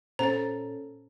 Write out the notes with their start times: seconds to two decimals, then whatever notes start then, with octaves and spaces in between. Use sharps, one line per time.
0.19 A#2 C#4 A4 C5 A#5 A6